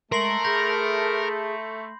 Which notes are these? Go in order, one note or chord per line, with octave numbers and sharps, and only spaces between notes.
G#3 A3 A#4 C6 C7 F#7
G#4 B5 G6 A#6